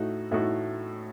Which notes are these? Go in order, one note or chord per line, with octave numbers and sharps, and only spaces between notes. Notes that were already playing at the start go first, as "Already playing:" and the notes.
Already playing: A2 A3 D#4 F#4
A2 A3 D#4 F#4